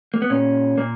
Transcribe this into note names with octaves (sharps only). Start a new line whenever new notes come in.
A#3
B3
A#2 C#4
A#2 A#3